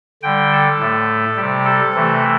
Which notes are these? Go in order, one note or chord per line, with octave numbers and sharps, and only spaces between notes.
D3 G3 G5
A4
A2 A3
C3 G3 G4
A4
C3 E3 A3